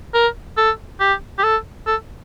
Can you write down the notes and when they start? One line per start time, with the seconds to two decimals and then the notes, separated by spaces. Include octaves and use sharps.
0.14 A#4
0.57 A4
1.00 G4
1.39 G4
1.43 A4
1.87 A4